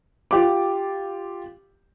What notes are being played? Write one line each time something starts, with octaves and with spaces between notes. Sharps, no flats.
F4 G4 D6